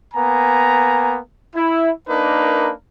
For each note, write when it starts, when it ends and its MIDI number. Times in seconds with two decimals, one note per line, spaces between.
0.14 1.17 58
0.14 1.17 59
0.14 1.17 80
0.14 1.17 82
1.55 1.90 64
2.08 2.72 58
2.08 2.72 62
2.08 2.72 63
2.08 2.72 70
2.08 2.72 71